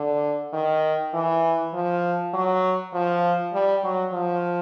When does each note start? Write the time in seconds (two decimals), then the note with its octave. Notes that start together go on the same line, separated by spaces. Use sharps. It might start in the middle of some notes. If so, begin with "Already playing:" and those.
Already playing: D3
0.53 D#3
1.14 E3
1.74 F3
2.34 F#3
2.93 F3
3.53 G3
3.84 F#3
4.13 F3